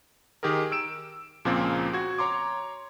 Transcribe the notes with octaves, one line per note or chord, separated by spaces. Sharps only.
D#3 G4 G#4 A#4
E6 D7 E7
C#2 A#2 C#3 F3 A#3 C4
F#4 G#6
C#5 A#5 C6 D6